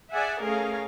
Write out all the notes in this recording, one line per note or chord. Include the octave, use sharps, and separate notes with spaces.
G#4 D5 E5 F#5 G#5
A3 C#4 G#4 A#4 F5